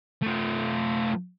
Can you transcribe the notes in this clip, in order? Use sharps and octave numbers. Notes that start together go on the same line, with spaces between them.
A3 F4